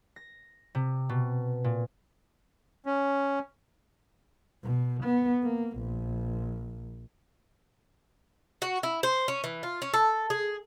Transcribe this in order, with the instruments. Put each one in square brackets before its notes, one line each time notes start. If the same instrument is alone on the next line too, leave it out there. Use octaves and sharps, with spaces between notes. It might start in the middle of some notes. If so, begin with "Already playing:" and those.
[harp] A#6
C3
B2
A#2
[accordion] C#4
[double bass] B2
B3
A#3
A#1
[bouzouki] F#4
E4
C5
C#4
E3
F4
C#4
A4
G#4